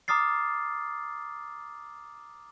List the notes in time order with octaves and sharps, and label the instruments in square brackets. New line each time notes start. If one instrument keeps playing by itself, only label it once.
[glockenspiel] A#5 D6 D#6 F6 A6 C7